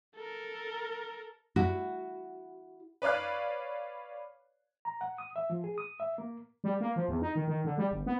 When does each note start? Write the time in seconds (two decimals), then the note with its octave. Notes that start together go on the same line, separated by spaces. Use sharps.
0.16 A4 A#4
1.56 E4 F#4
3.02 B4 C#5 D5 F5 F#6
4.85 A#5
5.01 F#5
5.18 D#6
5.36 E5
5.50 F3
5.64 G#4
5.78 D#6
6.00 E5
6.18 A#3
6.64 G3
6.81 A#3
6.96 F3
7.09 E2
7.22 D#4
7.35 D#3
7.48 D#3
7.65 D3
7.78 G3
7.91 G1
8.06 B3